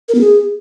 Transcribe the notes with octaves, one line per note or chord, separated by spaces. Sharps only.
A#4
B3
G#4